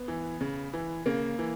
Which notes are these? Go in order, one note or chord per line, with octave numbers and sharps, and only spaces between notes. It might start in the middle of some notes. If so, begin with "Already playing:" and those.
Already playing: B3
E3
C#3
E3
C#3 A#3
E3